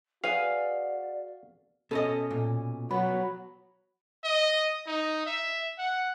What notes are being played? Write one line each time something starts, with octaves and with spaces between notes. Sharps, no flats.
F#4 G#4 B4 D5 F5 G#5
B2 C#4 A4 D#5
A#2
F#3 B3 B5
D#5
D#4
E5
F#5